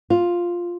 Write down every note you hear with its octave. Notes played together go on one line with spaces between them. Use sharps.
F4